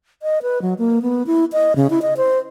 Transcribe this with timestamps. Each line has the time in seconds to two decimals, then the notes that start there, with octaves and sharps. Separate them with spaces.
0.23 D#5
0.43 B4
0.62 F#3
0.78 A#3
1.02 B3
1.27 E4
1.53 D#5
1.76 C#3
1.90 E4
2.02 D#5
2.17 C5